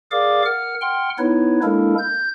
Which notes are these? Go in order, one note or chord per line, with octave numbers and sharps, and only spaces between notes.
G#4 A#4 D5 F5 D6
A#4 F#5 F6
F#5 G5 C6 F6
B3 D#4 E4 B4 C#5
G#3 A#3 D4 E4 A4 A#4
G6